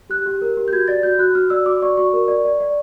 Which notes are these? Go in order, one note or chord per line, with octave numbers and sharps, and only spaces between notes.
G4 F#6
G4
A#4
G4
G6
F#4 G#6
D5 A6
F#4 G6
F#4 F#6
F#4 F6
D5 E6
F#4 D6
D5 C#6
F#4 C#6
A#4
D5
D5
D5